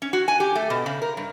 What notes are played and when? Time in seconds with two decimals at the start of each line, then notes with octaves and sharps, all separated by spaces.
0.02 C#4
0.13 F#4
0.28 G#5
0.40 G4
0.55 A3
0.70 B2
0.86 C#3
1.02 A#4
1.17 G2